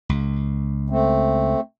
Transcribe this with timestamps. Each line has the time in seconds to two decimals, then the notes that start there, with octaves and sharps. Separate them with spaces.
0.09 C#2
0.90 A3 C4